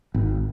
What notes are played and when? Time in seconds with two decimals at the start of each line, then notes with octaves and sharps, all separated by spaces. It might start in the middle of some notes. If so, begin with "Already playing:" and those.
0.14 G#1